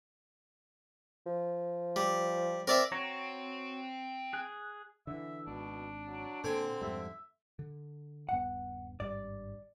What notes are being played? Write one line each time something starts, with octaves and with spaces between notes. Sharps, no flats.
F3
G3
C4 A#4 D5 E5
C4 F#4 C#5 A#5
G#4 F#6
D3 E3 E5
G#1 B2 D4
F#3
A#2 D3 C4 G#5
F2 G#2 G3 E5
D3
D#1 G2 B3 F#5
G#1 G2 G3 D5